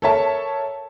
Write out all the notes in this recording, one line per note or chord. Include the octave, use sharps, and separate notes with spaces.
A4 A#4 C#5 E5 A5